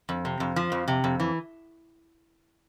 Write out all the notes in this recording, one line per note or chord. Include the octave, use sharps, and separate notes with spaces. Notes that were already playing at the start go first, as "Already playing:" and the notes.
F2
C3
F2
F3
F2
C3
F2
E3